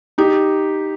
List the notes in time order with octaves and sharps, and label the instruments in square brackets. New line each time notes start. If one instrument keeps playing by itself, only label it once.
[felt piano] D#4 G4